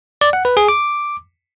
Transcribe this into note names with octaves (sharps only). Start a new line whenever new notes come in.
D5
F#5
B4
G#4
D6